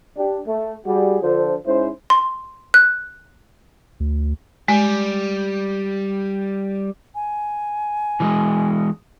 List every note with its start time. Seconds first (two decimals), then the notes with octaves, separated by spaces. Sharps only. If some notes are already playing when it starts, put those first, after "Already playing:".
0.16 D4 G4
0.47 A3
0.86 G3 F#4 G#4
1.22 D3 F3 D4 F4 A4 C5
1.66 G#2 C#4 E4 C5
2.10 C6
2.74 F#6
4.00 D2
4.68 G3 G#3
7.15 G#5
8.20 E3 G3 G#3